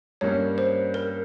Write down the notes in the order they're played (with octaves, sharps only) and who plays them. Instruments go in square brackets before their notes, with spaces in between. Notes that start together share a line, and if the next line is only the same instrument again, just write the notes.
[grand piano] G2 G3 A#3 C#4 [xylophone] C#5
[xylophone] C5
A#4